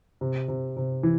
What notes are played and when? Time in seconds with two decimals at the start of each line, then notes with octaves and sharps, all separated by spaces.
0.21 C3
0.48 C3
0.77 C3
1.03 E3